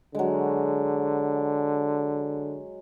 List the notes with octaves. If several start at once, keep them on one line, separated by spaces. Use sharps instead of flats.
D3 F#3 G#3